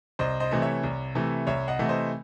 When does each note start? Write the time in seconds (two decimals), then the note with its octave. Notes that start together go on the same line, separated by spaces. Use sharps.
0.19 C2 C5 D#5
0.40 C5 D#5
0.51 C3 E3 A3
0.62 C#5 E5
0.84 C2
1.15 C3 E3 A3
1.47 C2 C#5 E5
1.68 D#5 F#5
1.79 C3 E3 A3
1.89 C5 D#5